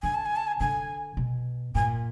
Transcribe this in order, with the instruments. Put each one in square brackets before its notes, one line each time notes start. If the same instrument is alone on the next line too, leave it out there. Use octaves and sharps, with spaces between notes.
[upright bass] D3 [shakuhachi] G#5
[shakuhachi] A5
G#5
A5
G#5
[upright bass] D3 [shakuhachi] G#5
[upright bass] B2
[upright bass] A#2 [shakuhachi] G#5